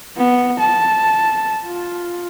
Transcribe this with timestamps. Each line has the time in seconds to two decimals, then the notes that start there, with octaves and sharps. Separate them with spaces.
0.17 B3
0.60 A5
1.65 F4